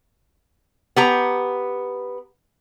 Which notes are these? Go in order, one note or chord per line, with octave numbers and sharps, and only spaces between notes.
B3 G4 A#5